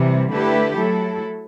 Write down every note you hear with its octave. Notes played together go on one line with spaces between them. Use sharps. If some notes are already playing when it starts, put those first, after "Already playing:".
Already playing: C3 E3 G3
D3 A3 E4 G4 B4
F#3 A3 E4 A4